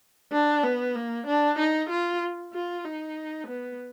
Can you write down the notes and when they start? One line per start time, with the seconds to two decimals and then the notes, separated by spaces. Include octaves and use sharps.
0.32 D4
0.63 B3
0.95 A#3
1.27 D4
1.58 D#4
1.90 F4
2.53 F4
2.85 D#4
3.47 B3